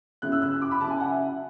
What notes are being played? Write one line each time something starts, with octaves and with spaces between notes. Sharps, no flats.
C#3 F#3 C#4 E4 F#6
E6
F#6
E6
D6
B5
C#3 F#3 C#4 E4 A5
G#5
F#5
E5